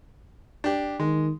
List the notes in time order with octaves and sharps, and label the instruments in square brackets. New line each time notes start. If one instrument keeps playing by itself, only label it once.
[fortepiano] D4 G4
[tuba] D#3 [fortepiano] G#3